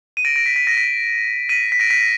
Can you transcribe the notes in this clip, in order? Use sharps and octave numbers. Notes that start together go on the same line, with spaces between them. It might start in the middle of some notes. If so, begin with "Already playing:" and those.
D#7
A#6 D7
A#6 D7
B6
B6
A#6
B6
B6 D#7
B6
A#6 D7
B6
A#6